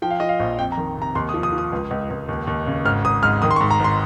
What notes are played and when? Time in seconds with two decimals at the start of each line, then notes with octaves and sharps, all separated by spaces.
0.02 F3 G5
0.11 F5
0.20 F3 D#5
0.29 F5
0.40 A#1
0.58 F2 G5
0.72 A#5
0.77 D#3
0.97 C3 A#5
1.15 D#2 C6
1.29 D#6
1.34 F3
1.43 D#6
1.52 F3
1.58 D#6
1.73 C#2
1.91 C#2
2.10 C#2
2.28 D#2
2.47 D#2
2.67 C#3
2.85 G#1 F6
3.05 G#1 D#6
3.23 G#2 F6
3.42 D#3 D#6
3.51 C6
3.56 C#6
3.61 G#2
3.71 A#5
3.80 G#1 C6